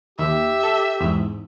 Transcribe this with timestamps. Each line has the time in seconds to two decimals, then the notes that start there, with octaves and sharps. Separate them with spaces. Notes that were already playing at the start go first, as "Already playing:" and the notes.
0.19 D#2 G4 E5
0.63 A4
1.00 E2 G#2